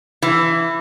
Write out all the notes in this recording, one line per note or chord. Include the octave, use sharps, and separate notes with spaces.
E3